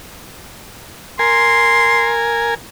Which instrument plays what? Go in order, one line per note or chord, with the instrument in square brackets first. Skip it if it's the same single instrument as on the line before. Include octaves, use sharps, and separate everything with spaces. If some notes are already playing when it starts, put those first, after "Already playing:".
[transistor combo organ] A#4 G#5 [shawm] C6